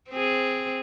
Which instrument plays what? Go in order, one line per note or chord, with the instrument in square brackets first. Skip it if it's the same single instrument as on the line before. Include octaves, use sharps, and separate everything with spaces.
[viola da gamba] C4 G#4